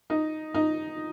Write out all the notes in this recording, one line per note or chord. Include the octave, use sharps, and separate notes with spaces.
D#4
D#4